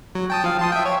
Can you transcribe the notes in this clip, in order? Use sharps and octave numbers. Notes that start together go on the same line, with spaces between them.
F#3
G5 A5 D#6
F3 F5
A5 C6 D#6
E5 G5
C#5